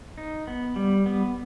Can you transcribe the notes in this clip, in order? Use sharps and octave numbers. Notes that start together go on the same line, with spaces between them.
D#4
B3
G3
B3